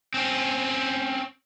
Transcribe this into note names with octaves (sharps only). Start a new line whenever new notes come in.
C4 C#4